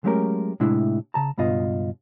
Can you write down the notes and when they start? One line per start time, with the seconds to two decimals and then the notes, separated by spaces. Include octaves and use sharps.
0.04 F#3 G#3 A3 C#4 G4 A#4
0.60 A2 C3 G#3 D4 E4
1.14 C#3 A5 A#5
1.38 C#2 G2 B2 F4 D#5